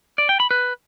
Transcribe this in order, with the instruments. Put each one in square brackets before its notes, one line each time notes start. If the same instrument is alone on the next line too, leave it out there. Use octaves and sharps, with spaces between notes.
[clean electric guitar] D5
G5
B5
B4